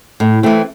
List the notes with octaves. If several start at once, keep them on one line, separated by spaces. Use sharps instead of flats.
A2
E3 A3 C4